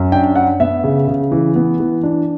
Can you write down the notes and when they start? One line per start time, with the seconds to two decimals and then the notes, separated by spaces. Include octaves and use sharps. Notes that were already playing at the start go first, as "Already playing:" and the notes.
Already playing: F#2
0.12 D4 G5
0.35 D4 F#5
0.60 B3 E5
0.84 C#3
1.08 C#3
1.32 E3
1.55 B3
1.80 E3
2.03 D4